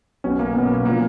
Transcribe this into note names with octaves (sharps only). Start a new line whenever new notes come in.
B1 B2 C#4
A#3
B1 B2 B3
A#3
D3 F3 A#3